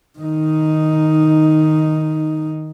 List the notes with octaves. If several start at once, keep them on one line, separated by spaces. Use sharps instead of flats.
D#3 D#4